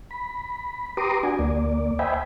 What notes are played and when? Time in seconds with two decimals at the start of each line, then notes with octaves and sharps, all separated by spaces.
0.11 B5
0.97 G4 B4 A#5 C6 D6 D#6
1.23 D4 F#4 G#5
1.39 D2 A#3 D5
1.99 C5 D#5 E5 G5 G#5 B5